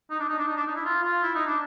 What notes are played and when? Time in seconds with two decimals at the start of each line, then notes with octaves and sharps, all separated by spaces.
0.10 D#4
0.20 D4
0.29 D#4
0.39 D4
0.48 D#4
0.57 D4
0.67 D#4
0.76 E4
0.85 F4
1.03 F4
1.23 E4
1.35 D#4
1.46 D4